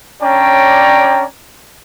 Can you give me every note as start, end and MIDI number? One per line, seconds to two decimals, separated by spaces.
0.23 1.25 61
0.23 1.25 62
0.23 1.25 73
0.23 1.25 74
0.23 1.25 79
0.23 1.25 82